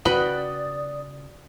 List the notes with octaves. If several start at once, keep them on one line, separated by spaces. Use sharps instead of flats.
C#3 F#4 B4 D5 G5 B5 D#6